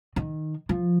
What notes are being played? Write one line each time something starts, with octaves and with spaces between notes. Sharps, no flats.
D#3
F3